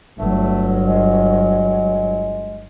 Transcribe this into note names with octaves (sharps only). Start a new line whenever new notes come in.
G1 F#3 A3
G#3